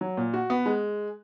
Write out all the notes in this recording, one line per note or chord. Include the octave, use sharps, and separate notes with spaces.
F#3
A#2
F#4
B3
G#3